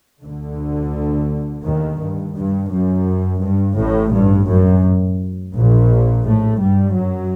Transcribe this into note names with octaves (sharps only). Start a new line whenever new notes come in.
D2 D3
D#2 D#3
G2
G2
F#2
G2
A1 A2
G2
F#2
A#1 A#2
A2 A3
G2 G3
F#2 F#3